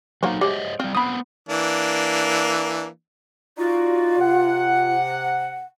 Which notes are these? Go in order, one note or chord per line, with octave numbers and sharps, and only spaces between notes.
F#3 A#3 D#4 F#4 C5
F#3 G#3 G4 C5 D#5 E5
G3 C4 F4
B3 C4 B5 D#6
E3 A#3 D4
D#4 F4 F#4 D5
C3 F#5